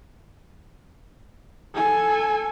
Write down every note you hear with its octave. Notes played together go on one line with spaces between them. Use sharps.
A4 G#5